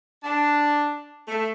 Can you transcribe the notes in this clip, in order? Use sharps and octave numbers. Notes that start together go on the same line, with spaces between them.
D4
A3